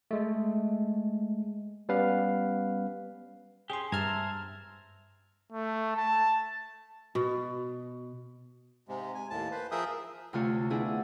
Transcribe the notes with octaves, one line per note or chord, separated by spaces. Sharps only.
G#3 A3
G3 B3 C#4 B4 F5
C#4 G4 G#4 C6
G2 C5 E5 A5 A#5 F6 G#6
A3
A5
B2
G#2 C3 G#3
G#5
D#2 A2 A5
B4 C5
F3 G#4 A#4 E5 G5 D#6
D2 C3 A3 F4 A4 C#5
B3 C4 D4 E4 G#4